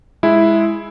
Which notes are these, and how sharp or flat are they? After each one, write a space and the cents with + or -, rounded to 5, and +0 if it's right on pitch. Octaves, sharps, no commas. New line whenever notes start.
G#3 +0 E4 +0